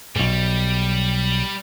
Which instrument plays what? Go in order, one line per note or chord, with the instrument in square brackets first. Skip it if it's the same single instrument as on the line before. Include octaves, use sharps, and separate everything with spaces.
[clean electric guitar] B1 G#2 [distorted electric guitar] G3